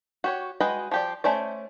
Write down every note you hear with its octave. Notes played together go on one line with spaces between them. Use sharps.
F#4 G4 C#5
G#3 F#4 B4 D#5 G5
F3 G4 D5
A3 C#4 C5 D5